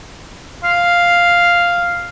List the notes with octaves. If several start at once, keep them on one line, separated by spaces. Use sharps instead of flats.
F5